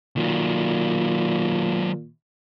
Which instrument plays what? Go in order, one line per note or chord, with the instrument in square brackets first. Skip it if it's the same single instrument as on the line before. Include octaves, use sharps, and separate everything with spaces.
[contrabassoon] A#2 [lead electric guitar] D#3 F#3